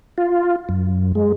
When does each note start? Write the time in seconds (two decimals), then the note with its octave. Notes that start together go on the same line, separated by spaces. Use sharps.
0.18 F4
0.69 F#2
1.15 G#3